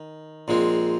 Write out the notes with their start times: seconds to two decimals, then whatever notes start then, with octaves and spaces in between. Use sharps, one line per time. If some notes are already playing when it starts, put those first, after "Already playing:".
Already playing: D#3
0.48 A#1 A#2 G#3 C4